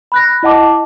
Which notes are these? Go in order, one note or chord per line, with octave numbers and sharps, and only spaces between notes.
B5 F#6 A#6
E4 D#5 F#5 A5 D6